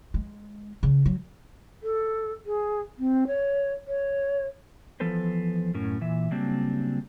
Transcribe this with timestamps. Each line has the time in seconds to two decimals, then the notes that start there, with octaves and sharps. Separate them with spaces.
0.14 G#3
0.83 C#3
1.06 F#3
1.83 A4
2.45 G#4
2.99 C4
3.27 C#5
3.87 C#5
5.00 E3 F3 B3 A4 B4 C5
5.74 F#2 A2 C#4 A#4
6.01 A#2 E3 E5
6.31 C#3 F#3 G3 A#3 C4 D4